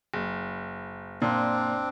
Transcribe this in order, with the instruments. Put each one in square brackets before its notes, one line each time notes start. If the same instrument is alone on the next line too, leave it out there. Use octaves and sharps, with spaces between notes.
[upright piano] F#1
[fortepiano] A#2 [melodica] C4 D4